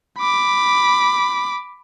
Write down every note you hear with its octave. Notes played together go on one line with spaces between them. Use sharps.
B5 D6